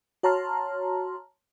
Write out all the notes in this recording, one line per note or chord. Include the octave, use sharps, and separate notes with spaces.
F#4 C#5 A5 A#5 C6 F6